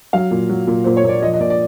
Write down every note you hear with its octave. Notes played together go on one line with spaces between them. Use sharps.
F#3 F5
A#2
F#3
A#2
A#2 C5
C#5
A#2 D5
F3 D#5
D#5
A#2 D5
D5